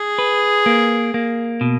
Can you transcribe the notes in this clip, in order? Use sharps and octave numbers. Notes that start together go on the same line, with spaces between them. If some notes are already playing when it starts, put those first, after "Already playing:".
Already playing: G#4
B4
A#3
A#3
B2